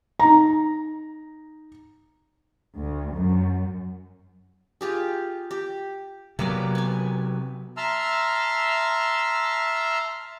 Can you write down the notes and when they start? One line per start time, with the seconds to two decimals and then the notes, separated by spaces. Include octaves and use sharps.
0.19 D#4 A#5
2.77 D2
3.15 F#2
4.81 F4 G4 G#4
5.51 G4
6.39 C3 F#3 A#3 B3 D5
6.75 B3 G#5
7.77 E5 A5 A#5 C6 E6 F6